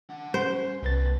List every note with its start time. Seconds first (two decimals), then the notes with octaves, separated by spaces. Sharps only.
0.10 D4 F#5
0.34 G3 C#4 C5
0.82 C2 G2 B2 B4 A6